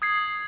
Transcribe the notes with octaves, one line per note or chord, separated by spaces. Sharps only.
D#6 G#6 C7